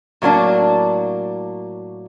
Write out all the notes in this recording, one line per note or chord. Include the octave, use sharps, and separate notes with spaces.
A2 F#3 A#3 D4